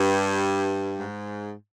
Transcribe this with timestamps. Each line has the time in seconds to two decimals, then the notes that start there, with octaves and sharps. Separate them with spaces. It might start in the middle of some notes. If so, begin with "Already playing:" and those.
Already playing: G2
0.98 G#2